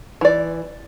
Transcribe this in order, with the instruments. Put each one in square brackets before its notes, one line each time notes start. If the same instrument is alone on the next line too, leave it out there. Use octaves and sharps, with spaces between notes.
[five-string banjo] E3 D5